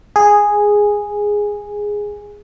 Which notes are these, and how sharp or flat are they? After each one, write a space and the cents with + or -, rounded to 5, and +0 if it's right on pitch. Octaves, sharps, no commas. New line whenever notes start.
G#4 -5